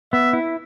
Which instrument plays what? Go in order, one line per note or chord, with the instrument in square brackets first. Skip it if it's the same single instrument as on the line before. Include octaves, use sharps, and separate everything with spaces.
[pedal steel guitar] B3 [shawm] E5
[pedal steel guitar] E4